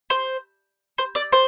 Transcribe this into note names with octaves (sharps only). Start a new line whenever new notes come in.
C5
C5
D5
C5